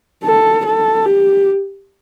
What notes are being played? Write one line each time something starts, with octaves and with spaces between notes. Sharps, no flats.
A4
A4
G4